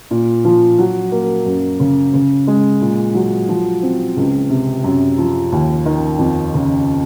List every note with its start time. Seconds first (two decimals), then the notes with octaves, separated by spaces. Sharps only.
0.11 A#2
0.45 F3
0.78 F#3
1.12 A#3
1.46 F#2
1.80 C#3
2.14 C#3
2.47 G#3
2.81 A#2
3.14 F#3
3.49 F3
3.83 C4
4.17 C#2
4.50 C3
4.84 F#2
5.18 F3
5.52 D#2
5.86 D#3
6.19 F2
6.54 C#3